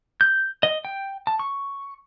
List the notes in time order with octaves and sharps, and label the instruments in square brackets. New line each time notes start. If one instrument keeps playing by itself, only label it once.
[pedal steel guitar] G6
D#5
G5
A5
C#6